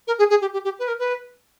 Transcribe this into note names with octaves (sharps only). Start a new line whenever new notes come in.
A#4
G#4
G#4
G4
G4
G4
B4
A#4
B4